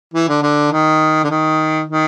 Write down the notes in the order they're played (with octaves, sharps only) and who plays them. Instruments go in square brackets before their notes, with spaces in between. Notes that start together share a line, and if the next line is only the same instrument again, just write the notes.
[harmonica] E3
D3
D3
D#3
D3
D#3
D#3